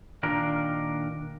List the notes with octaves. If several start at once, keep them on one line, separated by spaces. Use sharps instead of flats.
A#2 D#3 D4 F4 A#4